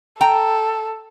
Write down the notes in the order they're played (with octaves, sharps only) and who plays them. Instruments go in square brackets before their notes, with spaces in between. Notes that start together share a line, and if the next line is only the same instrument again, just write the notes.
[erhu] A4 [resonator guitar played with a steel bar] G5 A#5